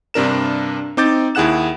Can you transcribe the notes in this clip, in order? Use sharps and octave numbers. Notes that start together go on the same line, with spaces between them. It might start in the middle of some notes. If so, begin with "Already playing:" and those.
G2 C3 D4 A#4 E7
C4 D#4 D6 G6 A6
D#2 E4 G#4 F#5 F#6 E7